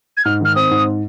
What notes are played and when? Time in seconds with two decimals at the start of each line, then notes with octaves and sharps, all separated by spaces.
0.17 G#6
0.25 G#2 F6
0.41 D#3 F6
0.55 C4 D#6
0.71 G#2